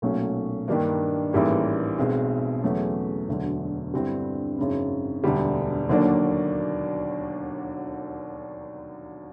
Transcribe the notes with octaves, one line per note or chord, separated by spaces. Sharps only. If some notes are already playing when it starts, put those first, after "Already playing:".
B1 A#2 F#3 A3 C#4
G2 D#3 G3 A#3 D4
A1 G#2 E3 G3 A#3
B1 B2 G#3 C4
E2 C#3 F#3 A3 C#4
E1 D2 D3 F#3
G2 D3 G3 C4 E4
G#1 F#2 C#3
E1 D2 D3 G3
D#2 D3 F#3 A#3 D4